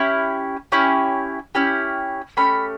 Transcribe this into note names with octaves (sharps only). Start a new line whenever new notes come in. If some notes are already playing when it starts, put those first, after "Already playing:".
Already playing: C#4 E4 G4
C#4 E4 G4
C#4 E4 G4
A3 C#4 G4 B5